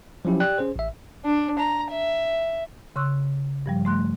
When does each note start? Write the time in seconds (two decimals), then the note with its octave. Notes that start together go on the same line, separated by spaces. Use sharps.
0.25 F3 F#3 C#4 E4 G4
0.40 G4 D5 G5 F#6
0.58 C#4 G#4 C5
0.76 A1 E5
1.25 D4
1.59 A#5
1.91 E5
2.96 C#3 C6 C#6 E6 F#6
3.66 G2 F3 G3
3.85 A3 C6 F#6